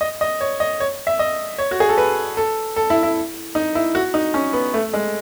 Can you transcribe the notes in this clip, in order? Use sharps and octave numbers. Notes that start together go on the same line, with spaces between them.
D#5
D#5
C#5
D#5
C#5
E5
D#5
C#5
F#4
G#4
A4
B4
A4
A4
E4
E4
D#4
E4
F#4
D#4
C#4
B3
A3
G#3